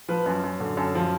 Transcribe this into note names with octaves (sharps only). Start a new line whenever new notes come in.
F3 B4
F#2
F#2
D3
F#2 A4
F3